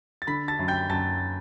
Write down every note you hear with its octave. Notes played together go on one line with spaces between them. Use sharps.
A6
D3 B5 B6
A5 A6
F#2
G5 G6
F#2 A5 A6